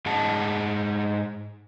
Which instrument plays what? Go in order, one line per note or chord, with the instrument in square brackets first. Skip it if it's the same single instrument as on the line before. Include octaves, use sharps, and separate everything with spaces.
[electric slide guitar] G#2 D#4 G#4 F#5 A5